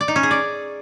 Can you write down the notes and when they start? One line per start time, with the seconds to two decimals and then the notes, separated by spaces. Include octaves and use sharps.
0.01 D5
0.08 D#4
0.16 C#4
0.23 G#4
0.31 D5